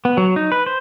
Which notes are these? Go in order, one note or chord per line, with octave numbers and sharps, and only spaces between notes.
B3
F#3
D#4
B4
C5